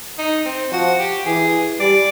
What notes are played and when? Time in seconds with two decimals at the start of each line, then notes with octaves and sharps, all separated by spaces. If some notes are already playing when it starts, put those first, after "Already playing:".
0.18 D#4
0.45 C4
0.72 F3 F#4
0.99 G4
1.26 E3 G#4
1.80 G3 D5